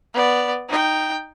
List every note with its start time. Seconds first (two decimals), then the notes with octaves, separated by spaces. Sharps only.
0.14 B3 D5
0.69 D#4 G5